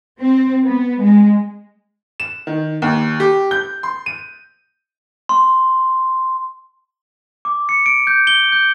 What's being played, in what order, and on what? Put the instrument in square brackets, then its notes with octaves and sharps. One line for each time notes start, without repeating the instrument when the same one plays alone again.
[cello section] C4
B3
G#3
[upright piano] E7
D#3
D#2
G4
G6
C6
D#7
[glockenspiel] C6
D6
C#7
D7
G6
G7
G6